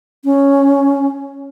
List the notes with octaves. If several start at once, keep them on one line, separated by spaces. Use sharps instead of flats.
C#4